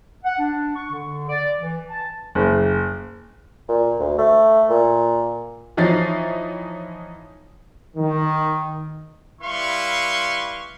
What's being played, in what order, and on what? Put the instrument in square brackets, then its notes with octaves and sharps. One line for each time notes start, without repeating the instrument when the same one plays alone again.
[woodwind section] F#5
D4
C#6
D3
D5
E3
A5
[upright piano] F#1
[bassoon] A#2
D2
A3
A#2
[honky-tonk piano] E3 F3 D#4 C#5 A6 C7
[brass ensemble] D#3
[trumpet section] G3 E4 B4 F5 C6 C#6